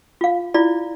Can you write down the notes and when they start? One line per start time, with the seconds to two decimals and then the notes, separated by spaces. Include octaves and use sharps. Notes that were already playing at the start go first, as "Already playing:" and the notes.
0.21 F4 F5
0.54 E4 F4 D5